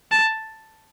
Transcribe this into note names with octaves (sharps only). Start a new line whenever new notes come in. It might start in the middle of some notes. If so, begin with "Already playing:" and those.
A5